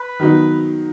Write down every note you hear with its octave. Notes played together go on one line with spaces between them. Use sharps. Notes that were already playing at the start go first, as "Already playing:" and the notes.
Already playing: B4
D#3 F#3 B3 D#4